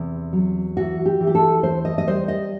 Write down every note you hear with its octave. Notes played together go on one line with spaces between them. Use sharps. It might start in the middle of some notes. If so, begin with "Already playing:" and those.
Already playing: E2 C3
F#3
E3 F#4
G4
E3
G4
A4
E2 C5
D#5
D#5
G3 C5
D#5